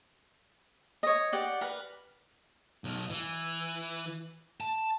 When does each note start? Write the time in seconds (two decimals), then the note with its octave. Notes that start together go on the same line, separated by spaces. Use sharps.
1.03 C#5 D#5
1.32 G4 D5 F#5
1.61 A#4 B4
2.84 B1
3.10 E3
4.60 A5